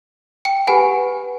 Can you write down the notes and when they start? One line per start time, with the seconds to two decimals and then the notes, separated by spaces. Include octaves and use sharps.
0.45 G5 C#7
0.67 G4 B4 F#5 G#5 B5